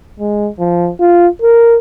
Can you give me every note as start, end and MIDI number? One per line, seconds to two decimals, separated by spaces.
0.20 0.49 56
0.59 0.90 53
1.00 1.27 65
1.42 1.78 70